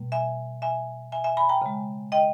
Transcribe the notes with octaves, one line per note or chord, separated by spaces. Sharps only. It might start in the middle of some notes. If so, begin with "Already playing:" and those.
Already playing: B2 G3 A#3
E5 G#5
E5 G#5
E5 G#5
E5 G#5
G#5 B5
G5 A#5
C#3 G#3
D#5 G5